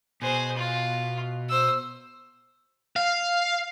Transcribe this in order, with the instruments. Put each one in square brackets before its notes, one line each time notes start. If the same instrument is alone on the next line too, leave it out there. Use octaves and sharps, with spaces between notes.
[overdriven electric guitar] B2 [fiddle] G#4 C5
[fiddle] F4
C5 E6
[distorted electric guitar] F5